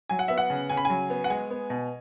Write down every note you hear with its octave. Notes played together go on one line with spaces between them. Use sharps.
F#3 G#5
F#5
B3 E5
F#5
C#3
C#3 G#5
B5
F#3 G#5
B3
F#5
G#3 G#5
B3
B2